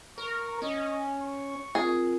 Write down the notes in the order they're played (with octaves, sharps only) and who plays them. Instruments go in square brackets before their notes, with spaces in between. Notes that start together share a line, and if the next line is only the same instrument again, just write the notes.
[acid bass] A#4 [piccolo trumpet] C#6
[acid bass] C#4 [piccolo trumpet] D#5
[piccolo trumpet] C#6
[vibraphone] C4 F4 A#4 [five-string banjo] G#4